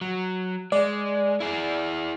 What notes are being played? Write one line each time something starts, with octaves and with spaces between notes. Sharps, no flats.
F#3
G#3 D5
E4 G#4